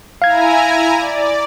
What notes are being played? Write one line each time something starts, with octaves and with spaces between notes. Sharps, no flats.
E4 F5 G#5 A#5 G#6
D5